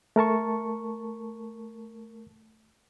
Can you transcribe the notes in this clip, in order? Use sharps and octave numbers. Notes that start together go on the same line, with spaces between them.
A3 A#4 A5 C#6